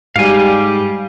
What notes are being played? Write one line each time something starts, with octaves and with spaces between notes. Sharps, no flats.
G#2 G3 F5 G#5